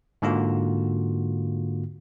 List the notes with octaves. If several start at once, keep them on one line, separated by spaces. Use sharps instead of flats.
G#2 D3 A#3 F4 F#4